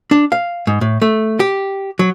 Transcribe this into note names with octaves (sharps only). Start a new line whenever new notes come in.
D4
F5
G#2
A2
A3
G4
F#3